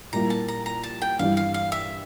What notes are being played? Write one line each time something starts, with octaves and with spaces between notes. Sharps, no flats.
A#2 G3 A#3 E4 A#5
A5
A#5
A#5
A5
G5
G2 E3 G3 F5
F5
F5
E5